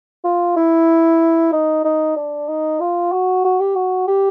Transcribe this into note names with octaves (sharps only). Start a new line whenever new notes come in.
F4
E4
D#4
D#4
D4
D#4
F4
F#4
F#4
G4
F#4
G4